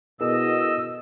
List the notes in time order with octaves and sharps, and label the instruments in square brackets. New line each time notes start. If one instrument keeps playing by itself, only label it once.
[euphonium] B2 [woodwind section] D3 B3 E6 [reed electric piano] E4 G#4 A#4 [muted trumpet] D#5